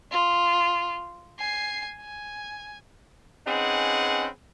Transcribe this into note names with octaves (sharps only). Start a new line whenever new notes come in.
F4
G#5 C7
G#5
C4 C#4 D#4 G#4 B4 F#5